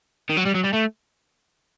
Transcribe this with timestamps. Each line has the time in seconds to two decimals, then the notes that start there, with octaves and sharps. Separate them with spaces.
0.30 D#3
0.37 F#3
0.46 G3
0.55 F#3
0.64 G3
0.74 A3